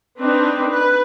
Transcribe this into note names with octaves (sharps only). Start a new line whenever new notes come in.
C4 D4 D#4 B4
B4